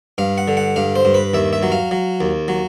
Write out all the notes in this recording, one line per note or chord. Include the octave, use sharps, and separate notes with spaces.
G2 F5
F#5
D3
F#5
G2 F5
C5
G2
B4
D#2 E5
E5
F#3
F5
F#3
D#2
F#3